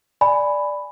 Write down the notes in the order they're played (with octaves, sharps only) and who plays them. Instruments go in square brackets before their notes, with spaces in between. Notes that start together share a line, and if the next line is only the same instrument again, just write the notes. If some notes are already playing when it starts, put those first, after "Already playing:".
[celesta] D5 G#5 B5